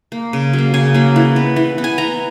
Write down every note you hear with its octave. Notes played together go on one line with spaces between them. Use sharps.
A#3
C#3
F#3
A#3
C#3 G#5
F#3 A#3
E3
B3
E3
B3
G#5
E3 A#5